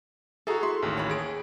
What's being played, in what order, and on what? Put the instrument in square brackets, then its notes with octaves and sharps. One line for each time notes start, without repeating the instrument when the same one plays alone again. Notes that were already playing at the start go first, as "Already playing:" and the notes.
[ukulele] E4 G#4 A#5 [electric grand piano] F#4 A4
[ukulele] E4 [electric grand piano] C6
[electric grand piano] A1 D#2
[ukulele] C#5 B5
[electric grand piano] G#4 D7